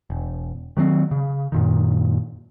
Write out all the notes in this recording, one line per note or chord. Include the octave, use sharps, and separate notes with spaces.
E1
D#3 F#3 G3 C4
C#3
F#2 A#2 D#3